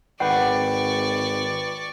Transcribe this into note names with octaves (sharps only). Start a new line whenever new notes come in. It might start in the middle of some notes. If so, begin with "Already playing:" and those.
G#1 B4 D5 F#5 G5 C#6